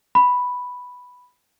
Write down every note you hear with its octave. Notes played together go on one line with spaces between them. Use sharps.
B5